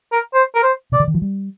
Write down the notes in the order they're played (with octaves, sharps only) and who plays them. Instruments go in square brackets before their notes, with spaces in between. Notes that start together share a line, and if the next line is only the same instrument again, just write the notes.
[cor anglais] A#4
C5
A#4
C5
[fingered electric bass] C3 [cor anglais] D5
[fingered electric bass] D3
D#3
F3
G3